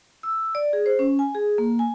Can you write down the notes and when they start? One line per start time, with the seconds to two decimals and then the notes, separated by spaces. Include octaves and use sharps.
0.23 E6
0.55 D5
0.73 G#4
0.86 C5
0.99 C#4
1.19 G#5
1.34 G#4
1.58 A#3
1.79 G#5